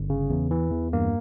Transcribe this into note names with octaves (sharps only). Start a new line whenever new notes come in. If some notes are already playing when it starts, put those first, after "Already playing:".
Already playing: G1
C#3
E2
E3
E2
G2 A#3